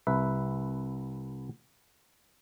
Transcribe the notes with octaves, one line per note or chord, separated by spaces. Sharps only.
C2 B4 E5